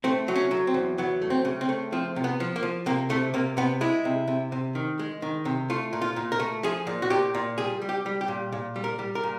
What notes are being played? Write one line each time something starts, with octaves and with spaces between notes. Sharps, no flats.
A3 C4
F#3
C#4
F#3
C4
E2
F#3 B3
A3
C4
C#3
C4
A3
F3 C4
C3
B3
F3
A#3
F3
C3 A#3
C3 A3
C3 A#3
C3 B3
G#3 E4
C3
C3
C3
D#3
G#3
D#3
C3
A3 F4
A#2
F4
A#2
A#4
A3
F3 G#4
A#2
F#4
A#2 G4
A#2
G3 G#4
G3
G4
G3
G4
A#2
A#2
G3
A#4
G3
A#4
A#2